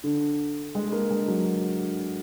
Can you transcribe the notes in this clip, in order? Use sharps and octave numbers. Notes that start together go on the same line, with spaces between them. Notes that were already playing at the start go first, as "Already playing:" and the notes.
D3
G#3
A#3
G#3
F#3